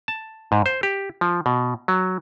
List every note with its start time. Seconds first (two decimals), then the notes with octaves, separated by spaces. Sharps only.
0.08 A5
0.52 G#2
0.66 C5
0.83 G4
1.21 F3
1.46 B2
1.88 F#3